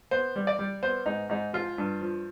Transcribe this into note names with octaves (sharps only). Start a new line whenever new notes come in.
B3 C5
G3
D5
G3
B3 C5
G#2 D#4
G#2 D#4
F3 F4
G2
F3